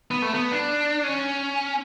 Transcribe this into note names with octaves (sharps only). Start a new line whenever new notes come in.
B3
A3
B3
D4
C#4